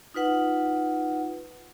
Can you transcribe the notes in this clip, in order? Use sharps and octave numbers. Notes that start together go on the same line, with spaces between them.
D#4 F4 B4 F#5